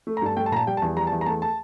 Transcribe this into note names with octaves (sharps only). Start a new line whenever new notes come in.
A3
A#5
G2 A5
A3 G5
A5
A#2 A5 A#5
G3 G5
A5
E2
G3 A#5
A5
E2
A#5
A3 A5
A5